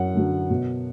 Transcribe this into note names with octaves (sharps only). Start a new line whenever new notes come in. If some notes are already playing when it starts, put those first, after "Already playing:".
Already playing: F#2 F#5
D3 F#3
B2